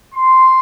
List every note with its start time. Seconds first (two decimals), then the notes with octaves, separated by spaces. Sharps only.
0.14 C6